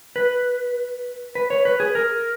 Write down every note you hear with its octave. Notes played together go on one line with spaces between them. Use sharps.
B4
B4
C#5
B4
G#4
A#4